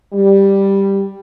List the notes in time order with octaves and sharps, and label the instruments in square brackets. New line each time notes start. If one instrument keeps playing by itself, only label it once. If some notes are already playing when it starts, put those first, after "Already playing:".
[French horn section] G3